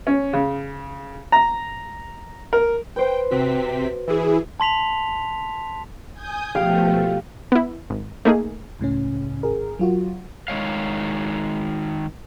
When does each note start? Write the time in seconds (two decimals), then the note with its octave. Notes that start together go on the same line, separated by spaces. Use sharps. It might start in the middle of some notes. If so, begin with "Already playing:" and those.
0.07 C#4
0.33 C#3
1.32 A#5
2.53 A#4
2.96 B4 C5 G5
3.31 C3 C4 F#4 B6
4.08 E3 E4 G#4
4.60 A5 C6 B6 F7
6.13 G#5 D#6 G6
6.55 B2 F3 A3 G4 F5
7.52 B3 E4
7.90 G#1
8.25 A3 A#3 D#4 G#4
8.80 C#2 A2 C#3 C#4
9.43 G#1 G#4 A#4
9.79 F#3 F4 F#4
10.48 D#3 G#3 C#5 F5